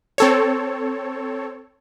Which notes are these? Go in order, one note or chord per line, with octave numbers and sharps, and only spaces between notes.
C4 A4 C#5